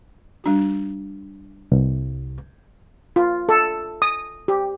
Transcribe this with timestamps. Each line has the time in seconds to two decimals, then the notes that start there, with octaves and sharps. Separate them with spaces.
0.44 G3 D4 F#4
1.72 C2
3.16 F4
3.49 A4
4.02 D#6
4.48 G4